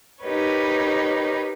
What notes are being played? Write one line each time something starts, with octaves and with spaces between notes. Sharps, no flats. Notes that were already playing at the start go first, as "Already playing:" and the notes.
D#4 G4 A#4 B4 C#5